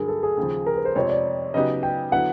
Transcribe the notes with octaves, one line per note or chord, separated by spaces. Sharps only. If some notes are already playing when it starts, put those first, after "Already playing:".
Already playing: G2 D3 F#3 G#4 A#4
A4
G#4
D#2 C#3 F3
A#4
B4
C5
F2 C3 F3 G#3 C4 C#5
D5
C#3 F#3 B3 D#4 G4 D#5
G5
D3 F#3 B3 E4 F#5